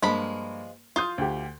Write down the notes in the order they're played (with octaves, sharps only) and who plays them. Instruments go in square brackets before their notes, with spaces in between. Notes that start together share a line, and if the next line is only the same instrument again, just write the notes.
[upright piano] G2 A#3 [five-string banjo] F3 G#3 B5
[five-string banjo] F4 [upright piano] C6 D#6 G6
[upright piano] D2 G4